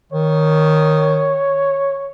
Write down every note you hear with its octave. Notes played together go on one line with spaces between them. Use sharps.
D#3 C#5